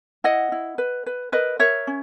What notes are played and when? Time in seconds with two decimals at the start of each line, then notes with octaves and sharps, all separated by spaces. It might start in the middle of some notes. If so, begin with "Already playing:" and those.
0.24 E4 D#5 F#5
0.52 E4
0.78 B4
1.06 B4
1.32 A#4 B4 D#5
1.59 A#4 C#5 E5
1.87 C#4